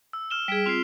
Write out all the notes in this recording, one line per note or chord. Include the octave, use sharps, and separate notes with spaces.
E6
F6 E7 G7
G3 G#4 B6 D7 E7
C4 F4 C7 F7